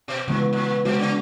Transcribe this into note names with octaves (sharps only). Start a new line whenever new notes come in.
B2
A#2 C#3 E3 G#3 B3
A#2
B2 G#3 B3 F#4
C#3